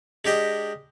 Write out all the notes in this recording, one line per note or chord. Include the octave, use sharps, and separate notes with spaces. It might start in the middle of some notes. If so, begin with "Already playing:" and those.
G#3 D4 G4 D#5